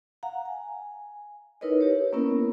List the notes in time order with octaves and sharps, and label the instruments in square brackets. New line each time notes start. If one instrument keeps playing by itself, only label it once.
[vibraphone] F5 F#5 A#5
G#5
D#4 E4 A#4 B4 C#5 D#5
G4 B4 C#5
A#3 B3 C#4 E4 A#4